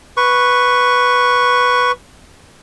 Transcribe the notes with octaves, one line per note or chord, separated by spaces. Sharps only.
B4 C#6